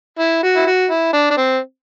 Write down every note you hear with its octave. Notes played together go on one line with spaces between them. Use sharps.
E4
F#4
E4
F#4
E4
D4
D4
C4